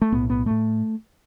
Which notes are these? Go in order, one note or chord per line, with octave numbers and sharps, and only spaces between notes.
A3
B1 A2 B3
B3
A2 A3